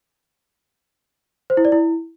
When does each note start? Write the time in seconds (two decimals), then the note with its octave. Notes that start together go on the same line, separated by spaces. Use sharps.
1.50 C5
1.57 E4
1.65 D5
1.72 E4